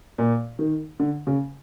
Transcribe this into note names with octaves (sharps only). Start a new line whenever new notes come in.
A#2
D#3
D3
C#3